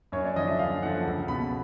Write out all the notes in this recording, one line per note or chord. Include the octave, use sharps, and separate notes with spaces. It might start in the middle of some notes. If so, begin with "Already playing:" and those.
F#2 C#5
D5
D3 F3 D#5
E5
F#2 F5
D3 F3 F#5
C#2
B2 B5